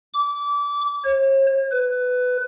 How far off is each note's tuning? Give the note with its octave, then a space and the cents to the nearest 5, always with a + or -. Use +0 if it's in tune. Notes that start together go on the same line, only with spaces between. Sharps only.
D6 -25
C#5 -45
B4 +15